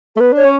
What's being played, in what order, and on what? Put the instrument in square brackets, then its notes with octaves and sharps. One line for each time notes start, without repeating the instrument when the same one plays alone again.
[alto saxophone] A3 [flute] A4
[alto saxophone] B3 [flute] B4
[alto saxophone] D4 [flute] C#5
[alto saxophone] C#4